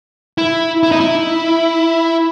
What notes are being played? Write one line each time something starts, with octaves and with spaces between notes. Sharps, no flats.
E4
E4
D#4
E4